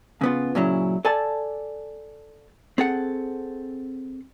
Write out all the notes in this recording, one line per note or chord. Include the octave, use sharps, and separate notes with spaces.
C#3 B3 F4
A#2 C#3 F#3 C#4 E4
A4 D5 G#5 A5
C4 G#4 A4 F#5